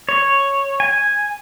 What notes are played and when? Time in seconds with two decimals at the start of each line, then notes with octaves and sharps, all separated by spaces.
0.09 C#5
0.80 G#5